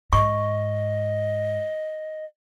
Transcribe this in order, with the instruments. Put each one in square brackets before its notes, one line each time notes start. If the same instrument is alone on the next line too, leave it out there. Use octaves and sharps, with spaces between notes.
[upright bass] G#2 [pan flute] D#5 [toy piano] C#6